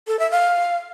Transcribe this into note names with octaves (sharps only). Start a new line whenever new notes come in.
A4
E5
F5